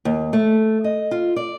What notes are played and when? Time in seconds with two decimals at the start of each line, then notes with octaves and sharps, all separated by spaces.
0.05 D#2
0.33 A3
0.84 D#5
1.11 F4
1.36 D5